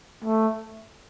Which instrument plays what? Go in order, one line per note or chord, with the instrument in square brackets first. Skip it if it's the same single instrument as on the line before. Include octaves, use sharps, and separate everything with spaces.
[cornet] A3